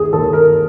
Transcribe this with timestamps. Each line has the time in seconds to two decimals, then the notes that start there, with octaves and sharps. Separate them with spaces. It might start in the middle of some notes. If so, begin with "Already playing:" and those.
Already playing: D#2 G#4
0.13 D#2 A4
0.33 A#4